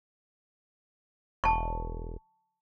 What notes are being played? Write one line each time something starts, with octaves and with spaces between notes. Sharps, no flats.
E1 A5 C#6